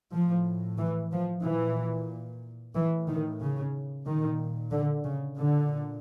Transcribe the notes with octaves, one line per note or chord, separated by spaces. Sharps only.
A2 F3
E3
F3
A#2 E3
A2 E3
D#3
C#3
A#2 D#3
D3
C#3
A#2 D3